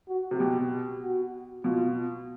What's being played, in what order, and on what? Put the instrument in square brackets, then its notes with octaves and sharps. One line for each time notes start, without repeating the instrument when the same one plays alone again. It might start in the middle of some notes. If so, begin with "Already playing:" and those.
[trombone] F#4
[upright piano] C3
[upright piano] B2 [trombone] G4
[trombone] F#4
[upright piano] B2 [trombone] F4